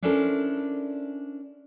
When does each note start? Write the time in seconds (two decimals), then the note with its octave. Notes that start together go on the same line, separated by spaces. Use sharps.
0.02 C#4 D4 E4 A4 A#4 C5